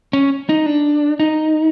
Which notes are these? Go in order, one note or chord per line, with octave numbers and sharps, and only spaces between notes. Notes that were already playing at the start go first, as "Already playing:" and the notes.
C#4
D#4
D4
D#4